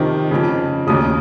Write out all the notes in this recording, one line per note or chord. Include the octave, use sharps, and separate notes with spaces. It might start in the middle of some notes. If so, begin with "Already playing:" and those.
Already playing: F2 C3 D#3
F2 C#3
D#2 C#3 D#6